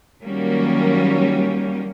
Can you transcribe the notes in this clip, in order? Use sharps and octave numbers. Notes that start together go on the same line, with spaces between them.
D#3 F#3 G3 A#3 C#4